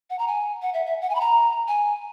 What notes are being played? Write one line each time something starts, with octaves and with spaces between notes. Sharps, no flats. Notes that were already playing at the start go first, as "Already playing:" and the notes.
F#5
A#5
G#5
F#5
E5
E5
F#5
G#5
B5
A#5
G#5